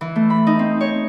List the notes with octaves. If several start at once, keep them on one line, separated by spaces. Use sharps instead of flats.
E3
A3
B5
D#4
C4
C#5